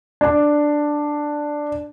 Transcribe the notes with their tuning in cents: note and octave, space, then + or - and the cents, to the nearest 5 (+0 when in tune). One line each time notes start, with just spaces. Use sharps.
D4 +5